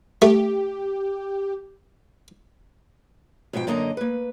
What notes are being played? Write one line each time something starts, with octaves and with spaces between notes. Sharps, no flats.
A3 G4
F2 G#2 B2 G5
F#2 D3 A#3 D#5 A5 A#5
A#3 B4